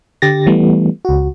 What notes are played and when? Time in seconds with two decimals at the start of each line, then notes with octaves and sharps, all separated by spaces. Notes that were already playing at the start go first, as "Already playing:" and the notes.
0.22 D3 G4 A6 A#6
0.47 E3 G3 A3 B3
1.05 C#2 F#4